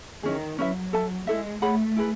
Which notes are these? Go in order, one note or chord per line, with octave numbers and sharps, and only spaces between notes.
D#3 C#4 E4 G#4
F#3 C#4 E4 B4 E5
A4 E5 A5
G#3 E4 A4 E5
A3 G#4 C#5 F#5 B5
E4 G#4 B4